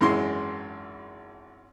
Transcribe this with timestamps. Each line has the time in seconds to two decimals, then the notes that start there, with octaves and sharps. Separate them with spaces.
0.01 G#1 F#2 E3 G#3 E4 C6